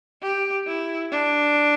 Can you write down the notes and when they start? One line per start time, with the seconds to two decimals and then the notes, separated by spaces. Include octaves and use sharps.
0.23 G4
0.67 E4
1.11 D4